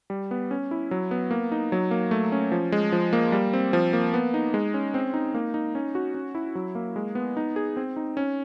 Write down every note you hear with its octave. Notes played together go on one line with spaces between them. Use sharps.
G3
B3
C#4
E4
F#3
B3
A#3
D#4
F#3
A#3
A3
C#4
F3
G#3
F3
A#3
G3
C4
F3
A#3
B3
D#4
G#3
C#4
C4
D#4
A#3
D#4
C#4
F#4
C#4
E4
F#3
A#3
G#3
B3
D#4
G#4
C4
D#4
C#4